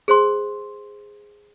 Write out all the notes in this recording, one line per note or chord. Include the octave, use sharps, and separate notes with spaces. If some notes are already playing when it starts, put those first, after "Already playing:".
G#4 C5 C6